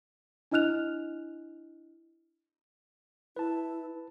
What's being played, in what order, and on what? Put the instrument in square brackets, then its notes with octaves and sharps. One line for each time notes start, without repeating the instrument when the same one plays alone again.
[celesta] D4 E4 D#5 F6 F#6 F7
[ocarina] E4 [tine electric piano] B4 A5